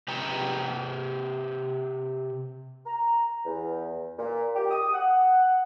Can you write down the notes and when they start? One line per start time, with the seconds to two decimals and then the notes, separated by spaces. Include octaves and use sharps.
0.08 C3 B4 G5 A#5
2.86 A#5
3.45 E2
4.19 A#2
4.55 G4
4.71 D#6
4.94 F#5